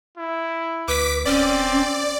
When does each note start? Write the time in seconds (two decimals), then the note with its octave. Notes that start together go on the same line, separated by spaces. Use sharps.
0.18 E4
0.88 D2 B4 D6 B6
1.25 D1 C4 C#4 D5